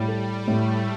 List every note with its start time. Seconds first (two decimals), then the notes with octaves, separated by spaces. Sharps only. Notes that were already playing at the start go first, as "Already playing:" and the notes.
Already playing: A2 G3
0.08 A4
0.48 A2 A3